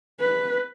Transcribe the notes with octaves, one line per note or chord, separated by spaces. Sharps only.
B4